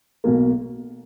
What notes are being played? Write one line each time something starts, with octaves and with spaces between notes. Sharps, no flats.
B1 B2 A#3